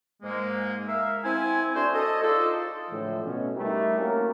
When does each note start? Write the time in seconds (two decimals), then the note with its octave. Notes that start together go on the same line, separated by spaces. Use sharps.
0.23 G#2 G#3 A#3
0.88 A#4 E5 F5
1.25 C4 E4 G#5
1.75 A3 D4 F#4 C5
1.94 A4 D#5
2.23 D#4 F4 G#4 A4 C5 D5
2.90 A2 D3 E3 F3 G#3 A3
3.23 B2 A3 C#4
3.55 G3 A3 D#4 E4 G4 A#4
3.98 A3 A#3 C4 C#4 F#4 A#4